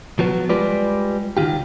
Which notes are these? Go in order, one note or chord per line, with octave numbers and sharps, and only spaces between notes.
F3 F#3 B3
G3 G#3 F4 B4 D5
C#2 D#3 F4 G4